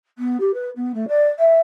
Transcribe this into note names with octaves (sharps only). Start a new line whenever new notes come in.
B3
G4
B4
B3
A3
D5
E5